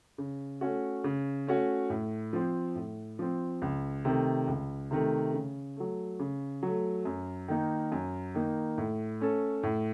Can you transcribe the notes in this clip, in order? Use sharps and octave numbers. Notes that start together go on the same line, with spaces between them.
C#3
A3 C#4 F#4
C#3
A3 C#4 F#4
A2
F3 C4
A2
F3 C4
C#2
C3 D#3 A3
C#2
C3 D#3 A3
C#3
F#3 A3
C#3
F#3 A3
F#2
D#3 A#3 D#4
F#2
D#3 A#3 D#4
A2
A3 C#4 A4
A2